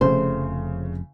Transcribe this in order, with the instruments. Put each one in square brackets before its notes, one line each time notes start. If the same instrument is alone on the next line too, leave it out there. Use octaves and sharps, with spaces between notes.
[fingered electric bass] F1 F2 [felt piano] C#3 A3 [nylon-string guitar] C5